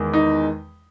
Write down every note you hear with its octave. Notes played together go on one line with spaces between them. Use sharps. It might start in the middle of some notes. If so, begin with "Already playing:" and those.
Already playing: E2 D#3 G#3
D#4